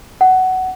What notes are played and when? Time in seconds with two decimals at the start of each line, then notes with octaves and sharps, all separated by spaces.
0.21 F#5